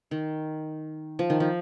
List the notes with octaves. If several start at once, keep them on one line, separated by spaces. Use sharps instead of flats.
D#3
F3
D#3
F3